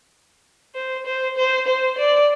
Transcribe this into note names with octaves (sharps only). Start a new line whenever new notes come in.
C5
C5
C5
C5
D5